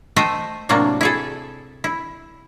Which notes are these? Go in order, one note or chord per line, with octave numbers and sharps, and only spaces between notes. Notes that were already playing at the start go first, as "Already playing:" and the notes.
A3 C5 D#5 E5 G5
A2 C3 F#3 A#3 D4
E4 G#4 A4
E4